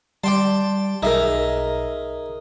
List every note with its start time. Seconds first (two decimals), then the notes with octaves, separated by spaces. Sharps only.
0.24 G3 D5 G5 A5 C6
1.03 B1 D#4 G#4 A#4 E5